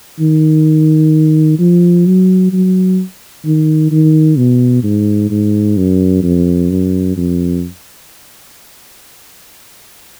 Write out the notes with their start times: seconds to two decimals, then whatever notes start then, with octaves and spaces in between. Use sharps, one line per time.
0.19 D#3
1.59 F3
2.06 F#3
2.52 F#3
3.45 D#3
3.91 D#3
4.37 B2
4.83 G#2
5.30 G#2
5.77 F#2
6.23 F2
6.70 F#2
7.17 F2